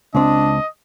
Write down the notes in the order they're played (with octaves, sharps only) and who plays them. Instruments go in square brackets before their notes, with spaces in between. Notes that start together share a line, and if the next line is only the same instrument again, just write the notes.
[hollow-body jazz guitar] C#2 C4 [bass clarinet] D4 [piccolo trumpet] D#5